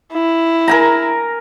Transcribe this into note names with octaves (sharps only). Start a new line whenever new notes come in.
E4
A#4 G#5 A#5